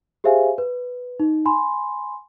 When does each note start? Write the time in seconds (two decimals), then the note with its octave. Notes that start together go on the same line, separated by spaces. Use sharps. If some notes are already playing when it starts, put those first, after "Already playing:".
0.24 G4 G#4 C5 E5 F5 G#5
0.58 B4
1.20 D#4
1.45 G#5 B5 C6